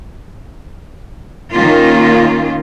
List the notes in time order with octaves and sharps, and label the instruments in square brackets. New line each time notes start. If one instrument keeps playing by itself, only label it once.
[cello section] D#3 A#3 C#4 F4